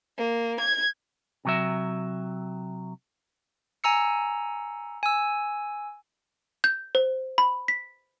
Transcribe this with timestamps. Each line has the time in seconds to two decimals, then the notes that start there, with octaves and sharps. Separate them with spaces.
0.18 A#3
0.60 G#6
1.45 C3 F#3 E5
3.84 G#5 A#5 E6 C#7
5.03 G#5 E6
6.64 G6
6.95 C5
7.38 B5
7.68 B6